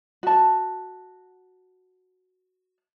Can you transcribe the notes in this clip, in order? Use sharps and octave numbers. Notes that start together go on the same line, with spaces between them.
F#4 A5